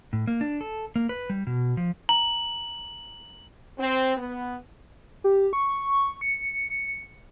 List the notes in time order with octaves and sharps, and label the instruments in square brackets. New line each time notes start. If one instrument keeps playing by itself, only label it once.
[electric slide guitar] A2
A#3
D4
A4
A#3
B4
G3
B2
F3
[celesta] A#5 [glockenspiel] F#7
[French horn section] C4
B3
[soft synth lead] G4
C#6
C#7